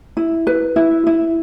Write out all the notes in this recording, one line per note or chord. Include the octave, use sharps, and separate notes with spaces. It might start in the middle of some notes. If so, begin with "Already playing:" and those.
E4
B4
E4
E4